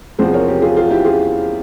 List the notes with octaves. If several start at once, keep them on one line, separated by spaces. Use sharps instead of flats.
E2 C3 F3 G#4 C5
A#4 C#5
G4 A#4
F4 G#4
F4 G#4
E4 G4
F4 G#4